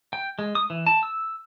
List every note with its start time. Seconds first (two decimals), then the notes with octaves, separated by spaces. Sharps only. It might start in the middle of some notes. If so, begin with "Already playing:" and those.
0.13 G5
0.39 G#3
0.55 D#6
0.70 E3
0.87 A5
1.03 E6